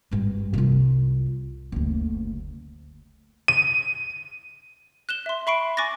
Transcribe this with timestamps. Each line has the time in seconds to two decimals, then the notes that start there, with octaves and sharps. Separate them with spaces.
0.11 G#1 G2
0.53 C2 F4
1.72 F#1 D2
3.48 D#7
5.09 F#6 E7 G7
5.26 E5 C6
5.47 E5 B5 C#6 C7 D7
5.77 G#5 C#6 D6 F#6 A6 A#6